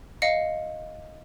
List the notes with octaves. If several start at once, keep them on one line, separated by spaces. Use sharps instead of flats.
D#5 F5 C#7